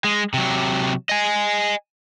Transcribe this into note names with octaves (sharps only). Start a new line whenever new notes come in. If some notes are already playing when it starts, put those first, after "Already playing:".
G#3
C3 F#3
D#5 G#5